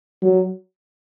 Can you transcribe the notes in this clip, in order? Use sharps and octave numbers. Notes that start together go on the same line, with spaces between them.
F#3